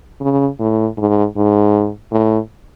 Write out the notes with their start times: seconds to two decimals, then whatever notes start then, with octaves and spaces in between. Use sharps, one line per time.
0.21 C#3
0.60 A2
0.98 G#2
1.36 G#2
2.12 A2